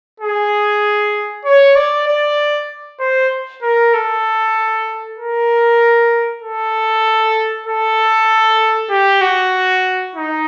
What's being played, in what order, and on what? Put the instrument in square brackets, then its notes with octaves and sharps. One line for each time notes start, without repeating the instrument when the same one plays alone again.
[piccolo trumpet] G#4
C#5
D5
D5
C5
A#4
A4
A#4
A4
A4
G4
F#4
D#4